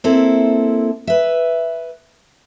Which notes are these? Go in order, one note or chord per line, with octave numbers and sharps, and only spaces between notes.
A#3 C4 E4 A4
B4 E5